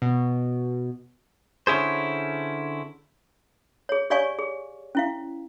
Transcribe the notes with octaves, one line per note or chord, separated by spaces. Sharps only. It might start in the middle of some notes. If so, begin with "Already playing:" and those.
B2
D3 C#4 E4 G#4 C5
G#4 C#5
G4 C#5 D5 F5 G#5 C#6
G#4
C#4 E4 F5